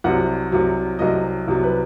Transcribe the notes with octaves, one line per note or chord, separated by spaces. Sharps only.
C2 C3 F#3 F#5
C2 C3 F#3
C2 C3 F#3 D#5
C2 C3 F#3
B4